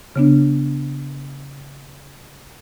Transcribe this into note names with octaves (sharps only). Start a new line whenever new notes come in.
C#3 B3 D4